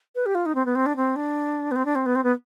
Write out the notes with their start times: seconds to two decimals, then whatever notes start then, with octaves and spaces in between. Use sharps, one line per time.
0.15 B4
0.26 G4
0.35 F4
0.45 D#4
0.55 C4
0.65 B3
0.75 C4
0.86 D4
0.96 C4
1.16 D4
1.71 B3
1.75 C4
1.85 D4
1.95 C4
2.06 B3
2.15 C4
2.23 B3